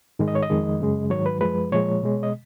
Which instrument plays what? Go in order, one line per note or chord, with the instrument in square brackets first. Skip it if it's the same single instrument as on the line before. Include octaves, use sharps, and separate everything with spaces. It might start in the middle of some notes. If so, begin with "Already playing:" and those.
[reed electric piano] G#2 D#3 G#3
D#5
C#5
D#5
F2 D#3 G#3
F#2 C#3 G#3
G#2 D#3 F#3 C#5
B4
F#2 F3 G#3 B4
A#2 F3 G#3 C#5
B2 G#3
D#5